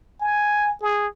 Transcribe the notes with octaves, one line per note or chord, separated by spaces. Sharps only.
G#5
G#4